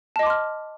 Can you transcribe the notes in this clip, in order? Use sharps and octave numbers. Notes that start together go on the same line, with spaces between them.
D#5 A5 C6 D6 F6